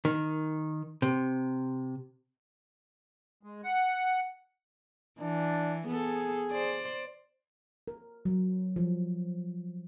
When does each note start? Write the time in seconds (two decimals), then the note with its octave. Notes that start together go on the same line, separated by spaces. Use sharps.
0.05 D#3
1.02 C3
3.43 G#3
3.64 F#5
5.20 E3 D4
5.87 B3 G#4 A4
6.52 C5 D5
7.88 A#4
8.25 F#3
8.76 F3